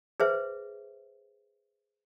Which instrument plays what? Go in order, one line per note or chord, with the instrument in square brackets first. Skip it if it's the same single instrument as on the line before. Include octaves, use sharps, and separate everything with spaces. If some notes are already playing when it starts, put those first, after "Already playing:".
[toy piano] G#4 B4 C5 E5